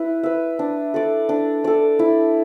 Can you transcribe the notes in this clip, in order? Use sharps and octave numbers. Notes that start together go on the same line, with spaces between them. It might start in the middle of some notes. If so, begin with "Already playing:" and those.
Already playing: E4 B4
B4 E5
D4
A4 D5
D4
A4 D5
E4